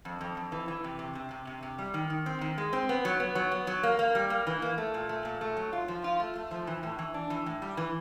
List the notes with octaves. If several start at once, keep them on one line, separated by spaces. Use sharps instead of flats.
F2
F2
F2
E3
E3
C3
C3
C3
C3
C3
C3
G3
D#3
D#3
C4
D#3
G#3
C4
B3
F#3
B3
F#3
B3
F#3
A#3
A#3
G3
A#3
E3
A#3
A3
A#2
A3
A#2
A3
F#3
F4
F3
F4
A3
A3
F3
E3
A2
E3
D4
E3
A2
G3
E3